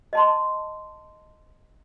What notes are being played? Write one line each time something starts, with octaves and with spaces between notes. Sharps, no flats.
D#5 A5 C6